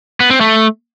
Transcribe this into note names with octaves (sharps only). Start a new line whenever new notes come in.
B3
C4
A3